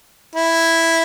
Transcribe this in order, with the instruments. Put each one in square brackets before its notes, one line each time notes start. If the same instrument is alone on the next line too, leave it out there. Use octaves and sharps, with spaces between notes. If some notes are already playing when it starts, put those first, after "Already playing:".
[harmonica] E4